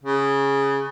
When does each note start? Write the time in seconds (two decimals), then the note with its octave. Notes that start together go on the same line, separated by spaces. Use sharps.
0.04 C#3